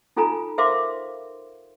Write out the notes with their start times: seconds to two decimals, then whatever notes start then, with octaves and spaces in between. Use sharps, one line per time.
0.17 D#4 F4 A4 G#5 A#5
0.58 A#4 C5 E5 F5 C6 D6